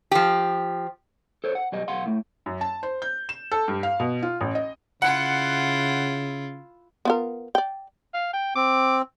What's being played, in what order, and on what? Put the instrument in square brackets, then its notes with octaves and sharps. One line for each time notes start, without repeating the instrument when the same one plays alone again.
[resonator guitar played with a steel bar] F3 G4
[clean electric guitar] A4 C5 C#5
F#5
B1 G3 D#5
B1 F5 F#5 C6
A2 A3
[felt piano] F#2
A5
C5
G6
E7
A4
G2
F5
B2
F4
A1
D#5
[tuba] C#3 [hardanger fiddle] E4 F4 [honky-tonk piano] F#5
[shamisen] B3 F4 A#4
D5 G5
[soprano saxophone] F5
G5
[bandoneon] C4 [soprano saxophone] D6